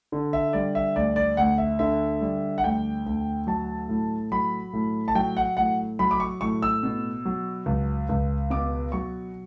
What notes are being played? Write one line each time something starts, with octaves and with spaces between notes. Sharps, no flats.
D3
E5
G3 D5
E5
D2 D5
D5
D2 F#5
E5
D3 E5
G3
F#5
D2 G5
D2
F#3 A5
A2
F#3 B5
A2
A5
F#3 G5
F#5
A2 F#5
F#3 B5
D6
C#6
A2 C#6
E6
B2
F#3
C#2
C#2
B2 D6
F#3 C#6